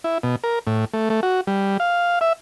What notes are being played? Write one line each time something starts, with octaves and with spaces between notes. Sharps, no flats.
E4
B2
A#4
A2
A3
A3
F#4
G3
F5
E5